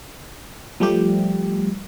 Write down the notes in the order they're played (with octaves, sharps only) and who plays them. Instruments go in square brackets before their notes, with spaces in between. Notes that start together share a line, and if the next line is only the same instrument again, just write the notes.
[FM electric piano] F3 G3 A3 G4